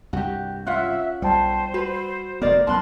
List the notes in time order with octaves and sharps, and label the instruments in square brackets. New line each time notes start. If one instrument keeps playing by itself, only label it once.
[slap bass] C2 G2 [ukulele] F#4 G4
[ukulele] C#4 F4 F#5 [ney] E5 [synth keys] F#6
[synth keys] B1 G5 A5 [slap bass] G3 [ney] C5
[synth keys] F#4 [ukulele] B4
[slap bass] F1 B3 [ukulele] A#4 D5
[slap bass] B1 B3 C#4 [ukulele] A#4 B5 [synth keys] A5 F#6 [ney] C6